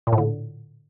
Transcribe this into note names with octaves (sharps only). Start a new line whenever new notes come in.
A#2
A2
D3